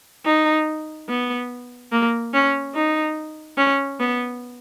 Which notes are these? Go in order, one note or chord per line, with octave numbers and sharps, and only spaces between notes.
D#4
B3
A#3
C#4
D#4
C#4
B3